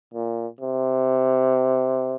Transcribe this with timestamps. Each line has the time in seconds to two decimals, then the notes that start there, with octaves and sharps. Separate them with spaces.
0.14 A#2
0.60 C3